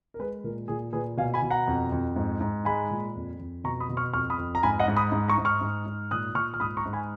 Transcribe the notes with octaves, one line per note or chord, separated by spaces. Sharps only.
A#4
G#3 G#4 B4
A#2 A#4
A#2 G#4
A#2 G#4 B4
B2 F5 G#5
G#5 B5
B2
F#5 A#5
F2
F2
G#2
G#2
G#3 G#5 B5
A#2
F2
F2
B2 A#5 C#6
B5 D#6
B2
C#6 F6
F2 C#6 F6
B5 D#6
F2
A#5
G#2 G#5 B5
D#5 F#5
G#2
B5 D#6
G#2
A#5 C#6
G#2
C#6 F6
G#2
G#2
A#2 D#6 F#6
A#2 C#6 F6
F6
G#2 B5 D#6
A#5 C#6
G#2
G#5 B5